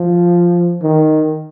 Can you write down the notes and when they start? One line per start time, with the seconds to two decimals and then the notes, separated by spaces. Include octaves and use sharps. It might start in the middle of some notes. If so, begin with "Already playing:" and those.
Already playing: F3
0.82 D#3